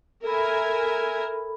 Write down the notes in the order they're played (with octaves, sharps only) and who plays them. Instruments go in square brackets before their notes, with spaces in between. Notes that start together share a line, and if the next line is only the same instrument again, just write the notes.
[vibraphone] A4 B5 [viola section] A#4 E5 G#5